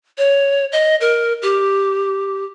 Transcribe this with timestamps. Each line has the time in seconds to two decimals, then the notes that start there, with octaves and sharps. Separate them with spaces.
0.18 C#5
0.72 D#5
1.01 A#4
1.42 G4